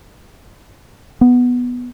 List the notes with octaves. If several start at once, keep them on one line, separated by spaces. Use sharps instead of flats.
B3